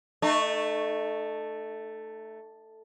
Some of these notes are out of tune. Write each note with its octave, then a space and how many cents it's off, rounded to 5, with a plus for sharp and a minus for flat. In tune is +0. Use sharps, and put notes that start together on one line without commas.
A3 +0 D#4 -35